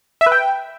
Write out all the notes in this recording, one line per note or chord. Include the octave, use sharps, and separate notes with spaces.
E5
B4
G5